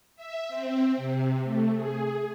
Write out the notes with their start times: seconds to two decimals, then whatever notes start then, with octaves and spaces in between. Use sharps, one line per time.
0.16 E5
0.49 C4
0.97 C3
1.44 A3
1.75 G#4